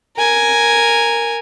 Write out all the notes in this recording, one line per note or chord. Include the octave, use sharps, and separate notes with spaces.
A#4 G#5